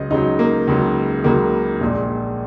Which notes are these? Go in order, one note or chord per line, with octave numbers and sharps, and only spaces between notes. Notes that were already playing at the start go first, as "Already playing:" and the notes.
Already playing: C#2 C#3 F#3 D#5
C#2 C#3 F#3 D#4
A#3
C#2 C#3 F#3
C#2 C#3 F#3 A#3
A#1 A#2 G#3